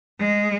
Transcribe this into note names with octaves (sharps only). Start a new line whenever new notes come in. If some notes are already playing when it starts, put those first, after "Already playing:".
G#3